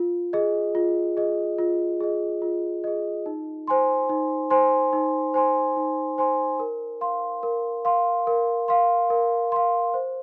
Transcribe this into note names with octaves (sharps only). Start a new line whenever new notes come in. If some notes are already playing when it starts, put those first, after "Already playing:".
Already playing: F4
G#4 D#5
F4
G#4 D#5
F4
G#4 D#5
F4
G#4 D#5
D#4
C5 G#5 C6
D#4
C5 G#5 C6
D#4
C5 G#5 C6
D#4
C5 G#5 C6
A#4
F5 C6
A#4
F5 C6
A#4
F5 C6
A#4
F5 C6
C5